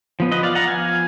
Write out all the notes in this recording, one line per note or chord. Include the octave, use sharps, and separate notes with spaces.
F3 B3
B4 D#5
D5 F5
F#5 A#5
F5 G#5